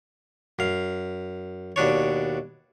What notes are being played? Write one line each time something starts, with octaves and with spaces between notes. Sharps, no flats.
F#2 F5
D#2 B2 D4 C#5